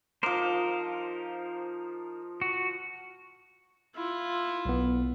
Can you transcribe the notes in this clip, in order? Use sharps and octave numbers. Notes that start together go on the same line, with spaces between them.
F3 D#4 A#4 C5 D6
F#4
E4 F4
B1 B3